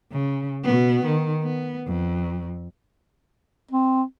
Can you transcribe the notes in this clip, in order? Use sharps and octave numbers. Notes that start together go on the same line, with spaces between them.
C#3
B2 B3
D#3
B3
F2
C4